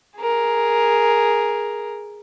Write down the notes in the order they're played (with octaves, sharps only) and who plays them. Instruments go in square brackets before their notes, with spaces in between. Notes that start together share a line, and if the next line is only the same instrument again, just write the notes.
[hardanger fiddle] G#4 A#4